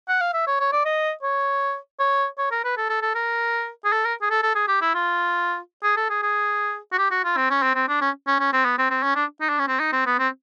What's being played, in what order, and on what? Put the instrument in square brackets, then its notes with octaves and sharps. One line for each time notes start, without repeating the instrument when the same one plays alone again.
[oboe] F#5
F5
E5
C#5
C#5
D5
D#5
C#5
C#5
C#5
A#4
B4
A4
A4
A4
A#4
G#4
A4
A#4
G#4
A4
A4
G#4
G4
E4
F4
G#4
A4
G#4
G#4
F#4
G4
F#4
F4
C4
C#4
C4
C4
D4
C#4
C#4
C#4
C4
B3
C4
C4
C#4
D4
D#4
D4
C#4
C4
D#4
C4
B3
C4